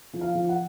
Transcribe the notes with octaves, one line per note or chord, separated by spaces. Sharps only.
F3
F5
F3
F#5